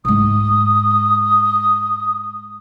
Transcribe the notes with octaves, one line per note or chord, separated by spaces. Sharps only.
G#2 G#3 D#6